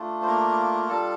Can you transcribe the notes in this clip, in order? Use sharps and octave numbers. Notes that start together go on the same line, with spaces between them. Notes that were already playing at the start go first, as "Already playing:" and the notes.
Already playing: A3 D4 F4
C5
A#3 A#4
G3 D4 F4 A4 A5